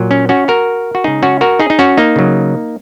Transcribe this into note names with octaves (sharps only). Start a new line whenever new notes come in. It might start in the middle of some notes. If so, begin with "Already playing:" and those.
Already playing: A#2 F#3
C#4
C#4 F#4
F#4 A#4
F#4
C#3 G#3 D#4 G#4
C#4 F#4
F#4 A#4
D#4 G#4
D#4
C#4 F#4
A#3 D#4
C#3 F#3